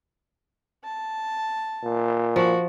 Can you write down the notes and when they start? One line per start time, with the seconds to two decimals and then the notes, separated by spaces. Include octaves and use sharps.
0.84 A5
1.83 A#2
2.36 F3 F#4